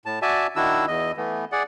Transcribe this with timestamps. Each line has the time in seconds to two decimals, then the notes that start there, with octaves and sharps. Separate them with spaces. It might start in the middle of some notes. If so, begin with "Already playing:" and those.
0.06 A2 A5
0.22 F#4 D5 E5 G#5 A5
0.56 D#3 D4 E4 F#4 E6
0.88 E2 D#5
1.17 E3 A3 B3
1.52 G#4 D5 F#5